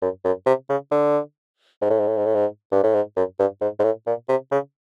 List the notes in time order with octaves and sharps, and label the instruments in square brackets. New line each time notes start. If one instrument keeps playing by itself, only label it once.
[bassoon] F#2
F#2
C3
C#3
D3
G#2
A2
G#2
A2
G#2
A2
G#2
G2
A2
G#2
F#2
G2
G#2
G#2
A2
A#2
C3
C#3